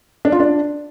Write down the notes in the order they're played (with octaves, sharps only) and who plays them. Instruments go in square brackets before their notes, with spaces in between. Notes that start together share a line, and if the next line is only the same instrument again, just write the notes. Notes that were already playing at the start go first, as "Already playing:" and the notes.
[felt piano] D4
F4
D4